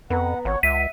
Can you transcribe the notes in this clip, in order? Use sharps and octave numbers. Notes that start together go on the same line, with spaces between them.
F2 B3 F#5 A#5
G#1 C#5 F#5
C#2 E5 B6 D#7